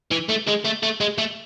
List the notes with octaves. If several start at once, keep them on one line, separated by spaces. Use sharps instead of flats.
E3
A3
G#3
A3
A3
G#3
A3